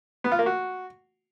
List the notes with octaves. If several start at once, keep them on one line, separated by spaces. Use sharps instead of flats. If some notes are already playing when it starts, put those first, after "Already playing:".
B3
F4
A#3
F#4